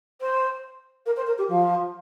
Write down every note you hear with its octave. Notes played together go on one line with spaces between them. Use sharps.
C5
A#4
C5
A#4
G4
F3